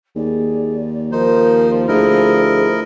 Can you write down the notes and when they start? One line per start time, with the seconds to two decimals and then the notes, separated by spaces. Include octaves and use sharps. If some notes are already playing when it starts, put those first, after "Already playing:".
0.16 D#2 G#4 D5
1.12 F3 D#4 A#4 C5
1.88 D2 E4 G#4 A#4 D#5